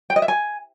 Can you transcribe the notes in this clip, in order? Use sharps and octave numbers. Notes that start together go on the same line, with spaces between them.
G5
D#5
E5
G#5